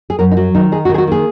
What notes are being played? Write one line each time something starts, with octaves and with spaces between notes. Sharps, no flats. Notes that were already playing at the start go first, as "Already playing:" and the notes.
G#4
F#2 A#4
D#4
F#3 F#4
D#3 D#4
D#4 G#4
F#4
D#3 G#4
F#4
A#3 G#4